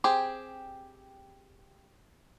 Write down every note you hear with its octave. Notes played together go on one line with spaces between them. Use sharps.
C4 G4 G#4